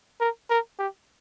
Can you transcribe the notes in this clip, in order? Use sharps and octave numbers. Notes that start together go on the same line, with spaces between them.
A#4
A#4
G4